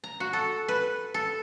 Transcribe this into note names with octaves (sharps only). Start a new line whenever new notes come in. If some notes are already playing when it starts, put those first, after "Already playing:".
A#5
F#4
A4
B4
A4